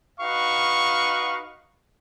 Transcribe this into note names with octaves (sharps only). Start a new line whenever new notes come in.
D#4 F#4 B4 F5 C#6